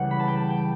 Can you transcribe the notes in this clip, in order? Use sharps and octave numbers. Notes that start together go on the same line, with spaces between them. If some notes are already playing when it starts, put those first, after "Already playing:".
Already playing: C#2 C#3 E3 G3 F#5
B5
A5
G5
A5
G5